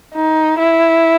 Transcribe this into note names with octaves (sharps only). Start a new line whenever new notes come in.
D#4
E4